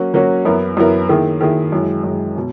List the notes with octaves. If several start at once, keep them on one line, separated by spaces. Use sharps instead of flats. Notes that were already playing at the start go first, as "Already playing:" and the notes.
Already playing: F#3 A#3 C#4 F#4
F#3 A#3 C#4 F#4
F#2 E3 B3 E4 A#4
F#2 E3 B3 E4 A#4
D#3 A#3 E4 G#4
D#3 A#3 E4 G#4
F#2 E3 G#3
F#2 E3 G#3
B2